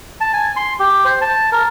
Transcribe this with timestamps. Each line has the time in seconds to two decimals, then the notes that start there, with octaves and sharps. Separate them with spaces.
0.21 A5
0.33 G#5
0.56 C6
0.80 G4
1.05 C5
1.21 A5
1.52 A#4